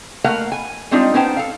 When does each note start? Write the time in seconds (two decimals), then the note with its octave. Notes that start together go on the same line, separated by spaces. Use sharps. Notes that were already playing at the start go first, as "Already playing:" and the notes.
0.24 A3 A#3 A#4 F5 F#5
0.52 G#5
0.91 G3 G#3 C4 D4 D#4 F4
1.14 B3 C#4 D#4 C5 G5 A5
1.37 A4 F5